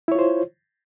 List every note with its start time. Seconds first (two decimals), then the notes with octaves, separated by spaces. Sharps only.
0.08 E4
0.12 C#5
0.15 F4
0.19 C5